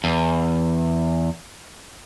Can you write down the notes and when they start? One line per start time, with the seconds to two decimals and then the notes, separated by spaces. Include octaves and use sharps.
0.04 E2